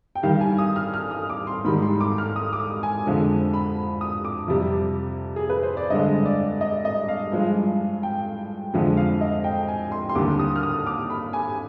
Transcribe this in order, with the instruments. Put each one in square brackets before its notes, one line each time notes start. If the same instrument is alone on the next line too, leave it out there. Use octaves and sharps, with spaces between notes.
[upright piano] G5
G2 D#3 G3 F5
G#5
D#6
F6
F6
D#6
D6
C6
G#2 D#3 G3 B5
C6
D6
F6
D#6
D6
D#6
G#5
F2 D3 F3 G#3
B5
D#6
D6
F2 C3 G3
G#4
B4
C5
D5
G2 D3 G#3 D#5
D5
D#5
D#5
F5
G2 F3 G#3
G5
F2 D3 F3 G#3
F5
D#5
G5
G#5
C6
C6
D#2 D3 G3 D6
D#6
F6
D#6
D6
B5
G#5